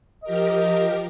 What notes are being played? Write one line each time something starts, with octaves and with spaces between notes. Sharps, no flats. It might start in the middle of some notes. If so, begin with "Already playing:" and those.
F3 G4 A#4 D#5